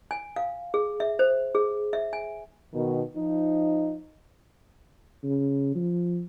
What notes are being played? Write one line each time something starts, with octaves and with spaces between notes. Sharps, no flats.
G#5
F5
G#4
E5
C5
G#4
E5
G#5
B2 D#3
F3 D#4
C#3
F3